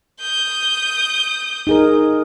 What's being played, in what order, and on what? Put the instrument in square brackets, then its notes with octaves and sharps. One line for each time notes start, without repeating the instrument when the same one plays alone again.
[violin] D#6 G6
[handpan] D#4 G#4 A#4